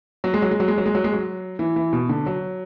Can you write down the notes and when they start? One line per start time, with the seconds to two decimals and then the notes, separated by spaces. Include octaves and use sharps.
0.24 F#3
0.34 G#3
0.42 F#3
0.51 G#3
0.60 F#3
0.68 G#3
0.78 F#3
0.86 G#3
0.95 F#3
1.04 G#3
1.13 F#3
1.59 E3
1.76 E3
1.93 B2
2.09 D3
2.26 F#3